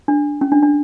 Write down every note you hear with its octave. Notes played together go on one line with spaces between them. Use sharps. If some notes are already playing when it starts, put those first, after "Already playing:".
D4
C#4
D4
D4